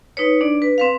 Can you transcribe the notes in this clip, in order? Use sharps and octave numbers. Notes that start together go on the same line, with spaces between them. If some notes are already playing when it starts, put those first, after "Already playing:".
D#4 B4 C#5
D4 D5
B4
C4 B4 F5